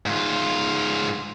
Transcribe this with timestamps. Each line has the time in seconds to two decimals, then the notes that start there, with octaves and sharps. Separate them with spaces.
0.06 G#2 F4